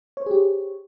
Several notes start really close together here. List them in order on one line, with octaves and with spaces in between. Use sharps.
C#5 C5 G#4 G4